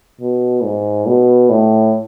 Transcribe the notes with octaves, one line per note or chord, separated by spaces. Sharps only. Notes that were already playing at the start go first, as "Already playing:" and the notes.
B2
G#2
B2
A2